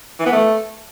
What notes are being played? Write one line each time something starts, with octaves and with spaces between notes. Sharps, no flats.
E3
B3
A3